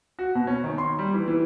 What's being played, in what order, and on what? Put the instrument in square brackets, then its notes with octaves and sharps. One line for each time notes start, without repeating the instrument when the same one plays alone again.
[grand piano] F#4
B2
C#4
D#3
C6
G3
E3
E3